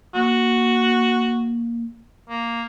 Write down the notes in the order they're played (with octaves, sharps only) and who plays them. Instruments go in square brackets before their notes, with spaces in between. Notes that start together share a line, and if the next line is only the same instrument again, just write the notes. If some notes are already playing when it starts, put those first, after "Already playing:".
[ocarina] A#3 [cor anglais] F#4
[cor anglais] A#3